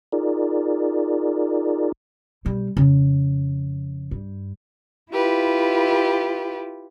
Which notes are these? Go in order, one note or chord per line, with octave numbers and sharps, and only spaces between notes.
D#4 F4 G#4 A#4 D5
B2 G3
F2 C#3
G2
E4 F4 G4 B4